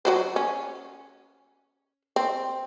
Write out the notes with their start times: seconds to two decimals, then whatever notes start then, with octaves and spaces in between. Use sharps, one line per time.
0.05 F#3 F#4 C5
0.36 C#4
2.16 C4